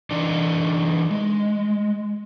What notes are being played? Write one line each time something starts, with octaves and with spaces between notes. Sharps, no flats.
E3 D4 D#4 D5
G#3